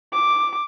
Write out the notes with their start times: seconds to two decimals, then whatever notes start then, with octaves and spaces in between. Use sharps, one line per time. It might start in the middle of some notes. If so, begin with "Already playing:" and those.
0.12 D6